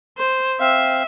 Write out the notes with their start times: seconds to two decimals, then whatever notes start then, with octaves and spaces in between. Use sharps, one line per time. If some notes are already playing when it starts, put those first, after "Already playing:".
0.18 C5
0.60 C4 E5 F5